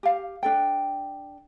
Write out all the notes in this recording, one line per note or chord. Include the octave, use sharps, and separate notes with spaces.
G4 F5
D4 A4 G5